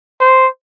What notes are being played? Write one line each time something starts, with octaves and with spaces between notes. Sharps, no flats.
C5